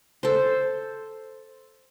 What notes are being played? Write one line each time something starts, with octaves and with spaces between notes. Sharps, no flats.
A4 C5